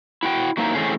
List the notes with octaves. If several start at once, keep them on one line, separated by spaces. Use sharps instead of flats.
E4 F#4 G5
F#3 A#3 C4 D#4 E4
E3 A3 C4 C#4 G#4